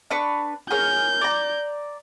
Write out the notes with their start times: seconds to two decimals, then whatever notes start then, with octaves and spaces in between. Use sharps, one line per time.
0.11 D4 B4 C#6
0.71 G#4 A#4 C#5 G6
1.21 D5 A#5